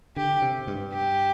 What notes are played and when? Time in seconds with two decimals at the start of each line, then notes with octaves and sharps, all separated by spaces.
0.16 D3 G4
0.42 C3
0.67 G2
0.92 G4